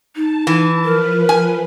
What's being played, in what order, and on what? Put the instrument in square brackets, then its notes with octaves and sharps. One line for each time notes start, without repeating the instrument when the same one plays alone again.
[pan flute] D#4 [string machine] A5
[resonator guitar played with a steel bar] E3
[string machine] F3 B4 [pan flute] A#4
[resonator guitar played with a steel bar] G#5